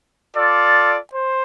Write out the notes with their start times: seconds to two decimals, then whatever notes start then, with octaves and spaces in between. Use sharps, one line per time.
0.35 F4 A4 D5
1.14 C5